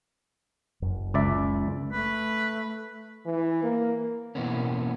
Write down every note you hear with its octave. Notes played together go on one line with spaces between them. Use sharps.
F#1 F#2 F#3
C#2 D5 E5
A3 B4
E3
A#3
B2 E3 A#3 B3 C#4